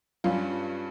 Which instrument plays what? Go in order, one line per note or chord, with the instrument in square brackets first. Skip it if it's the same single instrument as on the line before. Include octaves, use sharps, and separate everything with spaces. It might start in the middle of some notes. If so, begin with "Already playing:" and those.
[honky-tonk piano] G2 G3 C#4 [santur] F4